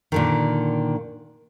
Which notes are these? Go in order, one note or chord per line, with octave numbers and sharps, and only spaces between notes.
A#2 D3 D#3